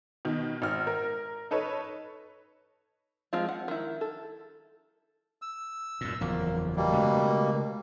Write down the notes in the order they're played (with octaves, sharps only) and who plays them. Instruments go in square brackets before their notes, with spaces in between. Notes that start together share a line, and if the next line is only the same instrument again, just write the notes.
[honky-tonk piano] B2 D#3
G#1 F6
A#4
D#4 A4 B4 C#5
[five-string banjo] F3 G#3 C4 F4
F#5
D#3 E4
A4
[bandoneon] E6
[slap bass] F#2 A#2
[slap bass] F#1 E2 F3 [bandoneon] A#3
[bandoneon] B2 G3 A#3
[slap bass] C#3 G#3 A3